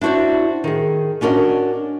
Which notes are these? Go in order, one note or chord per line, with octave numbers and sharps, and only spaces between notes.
D4 E4 F#4 C5 D5
D#3 G#4
C#4 D4 F#4 A#4 D#5